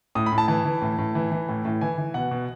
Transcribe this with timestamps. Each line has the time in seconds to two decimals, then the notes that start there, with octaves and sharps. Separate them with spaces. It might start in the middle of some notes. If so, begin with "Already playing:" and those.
0.15 A2 D#6
0.26 B5
0.32 A2
0.38 A5
0.48 E3 A5
0.65 E3
0.81 A2
0.98 A2
1.15 E3
1.32 E3
1.48 A2
1.65 A2
1.81 E3 G#5
1.98 E3
2.14 B2 F#5
2.31 B2